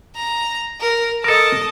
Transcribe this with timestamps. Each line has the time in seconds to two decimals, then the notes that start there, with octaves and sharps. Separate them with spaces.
0.15 A#5
0.80 A#4
1.24 A4 A#4 D#5 A5